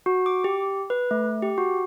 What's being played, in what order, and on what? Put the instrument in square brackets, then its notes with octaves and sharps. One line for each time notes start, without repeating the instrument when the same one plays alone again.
[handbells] F#4
D6
G4
B4
A3
G4
F#4